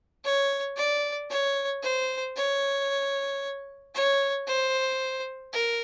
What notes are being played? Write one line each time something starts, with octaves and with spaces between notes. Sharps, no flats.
C#5
D5
C#5
C5
C#5
C#5
C5
A#4